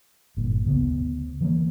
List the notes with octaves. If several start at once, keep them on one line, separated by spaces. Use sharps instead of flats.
G1 A#2
D2 C#3 B3
D3 E3 G#3 A#3